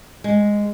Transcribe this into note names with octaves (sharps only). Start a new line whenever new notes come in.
G#3